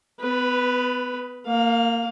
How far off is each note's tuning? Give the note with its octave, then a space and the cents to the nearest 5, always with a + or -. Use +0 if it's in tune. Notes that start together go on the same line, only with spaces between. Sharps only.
B3 +30 B4 +0
A#3 -20 F5 +20